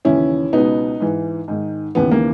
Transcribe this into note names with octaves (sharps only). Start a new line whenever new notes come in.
D#2 C#3 E3 C#4 E4
C#2 B2 B3 D#4
G#2 E3
G#2 D#3
D#2 C#3 E3 B3
A#3